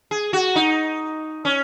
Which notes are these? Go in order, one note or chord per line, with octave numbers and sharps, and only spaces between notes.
G#4
F#4
D#4
C#4